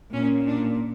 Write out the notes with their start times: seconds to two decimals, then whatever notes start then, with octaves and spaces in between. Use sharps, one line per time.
0.12 A#2 C#4
0.47 D4